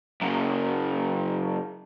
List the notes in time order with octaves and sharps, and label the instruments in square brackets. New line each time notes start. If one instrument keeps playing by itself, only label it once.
[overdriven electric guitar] F#2 C#3